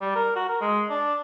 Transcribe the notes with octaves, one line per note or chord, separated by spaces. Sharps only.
G3
A#4
F#4
A#4
G#3
D4